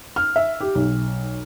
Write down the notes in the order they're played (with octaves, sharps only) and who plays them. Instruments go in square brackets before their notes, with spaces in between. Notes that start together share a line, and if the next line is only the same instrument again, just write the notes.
[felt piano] F6
E5
G4
B1